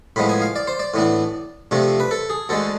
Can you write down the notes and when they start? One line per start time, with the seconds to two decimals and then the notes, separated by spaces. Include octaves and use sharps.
0.16 A2 F3 G#3 B3 B5
0.29 G#5
0.42 F5
0.56 D5
0.67 C5
0.80 D5
0.94 A2 E3 B3 D4
1.71 C3 F3 A3 D4
2.00 B4
2.11 A4
2.30 G#4
2.49 D2 D3 G#3 A4